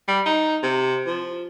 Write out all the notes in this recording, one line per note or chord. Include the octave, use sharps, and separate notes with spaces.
G3
D#4
C3
F3